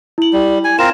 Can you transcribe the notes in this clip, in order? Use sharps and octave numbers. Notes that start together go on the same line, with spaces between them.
E4 F#7
G3
G#5
C4 F4 A#4 E7